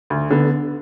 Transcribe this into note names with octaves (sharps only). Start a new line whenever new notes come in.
D2
D3 B3